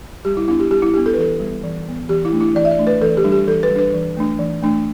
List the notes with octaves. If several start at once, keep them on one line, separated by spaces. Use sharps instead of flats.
G3 G4
E4
B3 D4 E4
G4
G3 G4
E4
B3 D4 G4
A4
B4
E3 A4
G3 B3
E3
G3 B3
E3 G4
E4
A3 D4
E4
E3 D5
E5
D5
A3 D4
B4
E3 A4
G4
G3 D4
G4
E3 A4
B4
G3
D4 B4
E3
A3 D4
E3
A3 D4